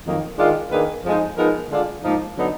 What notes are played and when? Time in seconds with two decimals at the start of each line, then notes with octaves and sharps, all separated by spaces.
0.05 F2 D#3 F#3 A#3 D#4
0.38 D#3 G#3 D4 F4
0.71 D#3 A#3 D4 G#4 B4
1.04 F2 F3 G#3 D#4
1.37 F3 G#3 B3 D#4 A#4
1.71 D3 G#3 D4 F4
2.04 G#2 F3 A#3 D#4
2.37 D3 F#3 B3 D#4